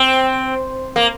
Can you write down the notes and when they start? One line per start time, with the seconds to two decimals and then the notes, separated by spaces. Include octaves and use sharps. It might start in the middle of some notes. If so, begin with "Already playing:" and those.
Already playing: C4
0.96 A#3